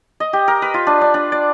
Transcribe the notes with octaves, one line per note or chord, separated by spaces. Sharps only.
D#5
G4
A#4
B4
F4
D4
D4
D4
D5